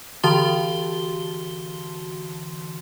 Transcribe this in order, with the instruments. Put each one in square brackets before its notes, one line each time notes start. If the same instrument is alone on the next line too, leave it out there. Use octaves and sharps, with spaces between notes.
[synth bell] D3 E3 F#4 A5 C6 G7